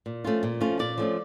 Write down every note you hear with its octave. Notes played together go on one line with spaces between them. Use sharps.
A#2
F3 A3 C#4 F4
A#2
F3 A3 C#4 F4
A#2 D5
F3 A3 C#4 F4